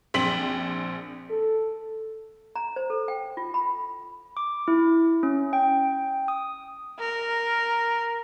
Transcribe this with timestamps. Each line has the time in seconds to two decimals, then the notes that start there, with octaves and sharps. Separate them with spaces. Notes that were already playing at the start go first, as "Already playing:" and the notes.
0.14 A#1 C4 C6 B6 F#7
1.30 A4
2.56 A#5
2.76 C5
2.90 A4
3.08 G5
3.37 F4
3.54 B5
4.37 D6
4.68 E4
5.23 C#4
5.53 G5
6.28 D#6
6.99 A#4